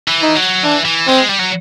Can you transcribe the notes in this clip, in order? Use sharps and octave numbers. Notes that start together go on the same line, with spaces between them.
E3
D#4
F#3
E3 D4
E3
G#3 C4
G3
F#3